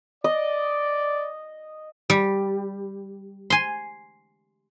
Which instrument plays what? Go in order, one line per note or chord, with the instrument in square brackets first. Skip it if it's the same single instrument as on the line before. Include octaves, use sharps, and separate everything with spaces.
[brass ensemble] D5 [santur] D#5
[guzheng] G3
G#5 C6